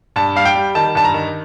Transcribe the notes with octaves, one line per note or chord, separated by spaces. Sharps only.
G2 A5
G3 F5
G5
G3
D#3 A5
G2 A5
A#5
D#3